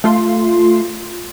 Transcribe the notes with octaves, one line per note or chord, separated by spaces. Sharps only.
A3 F4 C6